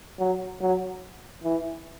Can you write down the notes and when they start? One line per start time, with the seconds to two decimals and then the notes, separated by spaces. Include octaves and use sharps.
0.19 F#3
0.61 F#3
1.44 E3